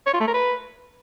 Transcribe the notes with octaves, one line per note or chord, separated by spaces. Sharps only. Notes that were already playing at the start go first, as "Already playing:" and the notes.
C#5
F4
A3
A#4
B4